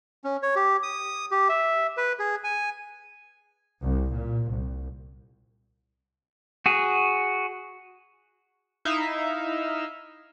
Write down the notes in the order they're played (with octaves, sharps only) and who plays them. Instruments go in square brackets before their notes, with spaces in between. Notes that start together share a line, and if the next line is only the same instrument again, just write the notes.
[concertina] C#4
C#5
G4
D#6
G4
E5
B4
G#4
G#5
[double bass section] C2
A#2
C2
[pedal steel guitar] F#4 G#4
[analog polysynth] D#4 E4 E5 F5